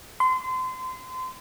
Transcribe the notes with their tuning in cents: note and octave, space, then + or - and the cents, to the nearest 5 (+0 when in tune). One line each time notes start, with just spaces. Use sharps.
C6 -30